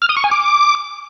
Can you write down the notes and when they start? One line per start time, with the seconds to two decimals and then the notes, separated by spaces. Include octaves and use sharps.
0.02 F6
0.09 D#6
0.17 C#6
0.24 G#5
0.31 D6